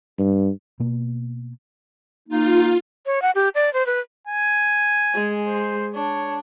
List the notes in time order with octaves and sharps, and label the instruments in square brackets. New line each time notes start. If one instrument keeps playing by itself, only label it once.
[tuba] G2
[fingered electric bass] B2 A#3
[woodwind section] A#3 D#4 [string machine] F4
[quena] C#5
F#5
G4
D5
C5
B4
[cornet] G#5
[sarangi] G#3
[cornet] C5
[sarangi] D4 [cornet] C#5